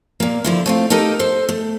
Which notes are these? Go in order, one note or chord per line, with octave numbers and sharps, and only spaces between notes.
A#2 A#3
D3 F3 E4
A3 C4 F4
D#4 G4 A4 A#4 D#5
A4 C5
A3